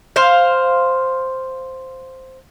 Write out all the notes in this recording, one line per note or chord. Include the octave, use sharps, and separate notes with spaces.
C5 F5